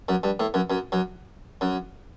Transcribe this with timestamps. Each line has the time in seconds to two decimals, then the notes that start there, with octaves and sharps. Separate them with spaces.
0.09 F#2
0.23 G2
0.40 A2
0.54 F#2
0.70 F#2
0.92 F#2
1.61 F#2